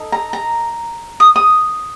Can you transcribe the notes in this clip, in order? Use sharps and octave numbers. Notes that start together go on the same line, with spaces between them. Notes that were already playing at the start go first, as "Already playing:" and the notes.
Already playing: D#4 A4
A#5
A#5
D#6
D#6